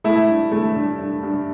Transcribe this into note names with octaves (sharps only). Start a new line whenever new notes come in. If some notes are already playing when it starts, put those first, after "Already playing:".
A3 E4
G2
A3
G2
G2
G2